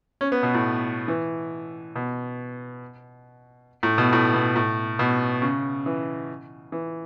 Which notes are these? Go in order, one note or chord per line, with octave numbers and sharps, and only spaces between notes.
C#4
B3
B2
A2
E3
B2
A2
B2
A2
B2
A2
B2
C#3
E3
E3